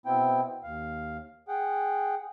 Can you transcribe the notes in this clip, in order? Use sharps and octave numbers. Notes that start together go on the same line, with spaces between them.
B2 B3 C4 E4 G5
D#2 F5
G#4 F#5 G5